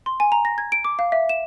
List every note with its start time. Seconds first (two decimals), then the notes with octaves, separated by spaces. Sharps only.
0.06 C6
0.20 G#5
0.32 A#5
0.45 A#6
0.58 G#6
0.72 D7
0.85 D6
0.99 F5
1.12 E5
1.29 E7